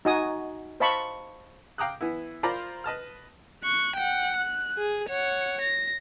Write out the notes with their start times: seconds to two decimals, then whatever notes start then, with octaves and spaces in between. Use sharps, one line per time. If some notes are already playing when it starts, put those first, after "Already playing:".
0.05 D#4 F#4 D#5 G#5 D#6
0.80 C5 D#5 F5 A5 B5 C#6
1.78 F5 G5 A#5 D6 D#6 F#6
2.01 E3 B3 E4
2.43 F4 A#4 C5 D5 A#5 B5
2.84 B4 D#5 A5 F6
3.64 C#6 F#6
3.96 F#5 G5
4.37 F#6
4.78 G#4
5.09 C#5 F#5
5.61 A#6